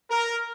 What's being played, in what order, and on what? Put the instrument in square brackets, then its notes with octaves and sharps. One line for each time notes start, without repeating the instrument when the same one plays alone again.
[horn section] A#4